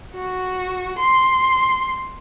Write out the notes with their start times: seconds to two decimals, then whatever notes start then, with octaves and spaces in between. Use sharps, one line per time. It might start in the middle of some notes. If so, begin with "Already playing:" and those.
0.15 F#4
0.99 C6